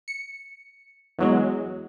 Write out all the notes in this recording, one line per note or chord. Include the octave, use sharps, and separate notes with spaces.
C#7
E2 F#3 G#3